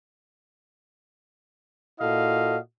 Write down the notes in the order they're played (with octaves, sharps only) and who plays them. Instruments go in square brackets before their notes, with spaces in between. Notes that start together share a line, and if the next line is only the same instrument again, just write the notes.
[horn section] A#2 E4 F#4 A4 D#5 F5